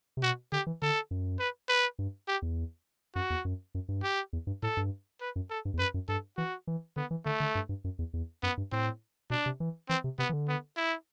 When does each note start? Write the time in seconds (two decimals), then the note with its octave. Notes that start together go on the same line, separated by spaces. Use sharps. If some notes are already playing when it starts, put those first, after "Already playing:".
0.17 C3
0.23 B2 F#4
0.52 D3 G4
0.67 E3
0.82 D3 A4
1.11 F#2
1.39 B4
1.69 B4
1.99 G2
2.28 G4
2.42 E2
3.15 F#2 F#4
3.30 E2
3.45 F#2
3.75 F#2
3.89 G2
4.03 G4
4.33 E2
4.47 G2
4.62 A2 A4
4.77 G2
5.21 B4
5.36 F#2
5.50 A4
5.65 G2
5.74 E2
5.79 F#2 B4
5.94 F#2
6.08 G2 A4
6.37 E3 F#4
6.67 E3
6.96 D3 B3
7.11 E3
7.25 D3 A3
7.40 D3
7.55 G2
7.69 G2
7.84 F#2
7.99 E2
8.13 E2
8.43 F#2 B3
8.57 G2
8.71 A2 C4
9.30 B2 D4
9.46 C3
9.60 E3
9.89 E3 C4
10.04 C3
10.18 C3 B3
10.29 E3
10.33 D3
10.48 B3
10.77 E4